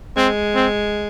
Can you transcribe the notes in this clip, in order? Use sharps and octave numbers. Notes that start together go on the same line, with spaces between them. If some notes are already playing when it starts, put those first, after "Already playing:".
G#3 C4
C4